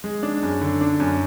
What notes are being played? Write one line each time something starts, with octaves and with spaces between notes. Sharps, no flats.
G#3
D4
F#2
D3
D4
F#2